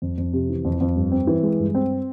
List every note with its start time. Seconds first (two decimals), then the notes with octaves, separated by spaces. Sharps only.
0.02 F2
0.18 F2
0.33 C3
0.49 E3
0.65 F2
0.81 F2
0.96 G2
1.12 C4
1.27 E3
1.43 G#3
1.59 G2
1.75 C4